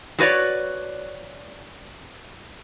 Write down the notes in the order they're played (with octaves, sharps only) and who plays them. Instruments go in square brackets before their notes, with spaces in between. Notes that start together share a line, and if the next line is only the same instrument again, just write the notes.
[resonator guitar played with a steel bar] F#3 F#4 B4 C#5 D5